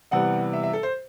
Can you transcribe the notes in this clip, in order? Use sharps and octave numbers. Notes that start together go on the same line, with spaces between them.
C3 E3 G3 B3 F#5
E5
E5
A4
C5